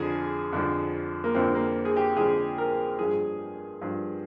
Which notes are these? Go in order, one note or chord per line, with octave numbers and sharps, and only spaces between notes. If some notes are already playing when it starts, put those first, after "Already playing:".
Already playing: F2 D3 F3 G#4
F2 D3 F3
A#3
F2 D3 F3 C4
A#3
G#4
G4
F2 D3 F3 G#4
A#4
G2 F3 G#4
G2 F3